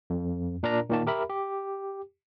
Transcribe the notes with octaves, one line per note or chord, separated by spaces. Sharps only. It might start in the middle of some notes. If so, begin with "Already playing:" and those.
F2
A#2 D4 A#4 D5 A#5
A#2 D#3 A#3 A5
G4 A#4 E5 B5
G4